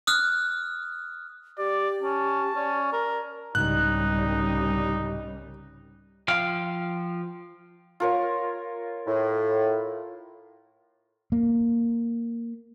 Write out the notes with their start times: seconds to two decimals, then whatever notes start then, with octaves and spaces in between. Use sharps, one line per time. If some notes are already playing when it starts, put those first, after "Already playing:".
0.07 D#6 F6 F#6
1.58 G4 D5
2.02 C#4 A5
2.56 C#4 D5
2.93 A#4
3.55 C2 G#2 C#3 G3 C#4 D#4 F#6
6.28 F3 F5 G5 F6
8.00 F4 A#4 C#5
9.07 A2
11.32 A#3